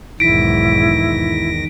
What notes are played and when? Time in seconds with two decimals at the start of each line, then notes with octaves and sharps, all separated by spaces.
0.20 B1 E2 G#2 D#3 E4 A#6 B6 D7